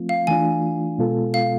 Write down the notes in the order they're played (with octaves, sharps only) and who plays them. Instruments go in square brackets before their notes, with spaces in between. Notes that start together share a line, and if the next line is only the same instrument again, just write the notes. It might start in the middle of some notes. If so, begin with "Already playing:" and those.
Already playing: [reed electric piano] F3 A3 C4 F4
[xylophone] F5
[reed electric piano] E3 A3 D4 F4 [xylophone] G#5
[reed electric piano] B2 G#3 B3 F4 A4
[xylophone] F5